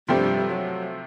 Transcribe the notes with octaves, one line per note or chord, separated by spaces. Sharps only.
G2 C3 F3 G3 A3 C4
G3
F#3